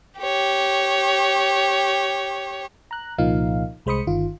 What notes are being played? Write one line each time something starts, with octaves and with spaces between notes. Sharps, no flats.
G4 C#5
A#5 F#6
C2 A#2 F3 A#3 D#4 F5
C2 G#3 C5 B5 D#6 C#7
G1 D#3 F4